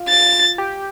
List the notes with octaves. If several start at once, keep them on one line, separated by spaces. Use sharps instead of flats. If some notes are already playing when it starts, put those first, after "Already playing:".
Already playing: F4
A6
G4